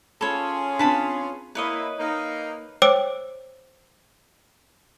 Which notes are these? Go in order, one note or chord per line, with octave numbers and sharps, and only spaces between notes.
C#4 F4 G#4 A4 C#5 A5 B5
C4 D4 B4 A5 B5
A#3 E4 B4 C#5 D#5
A#3 D#4
C5 C#5 G5 D6 E6 D7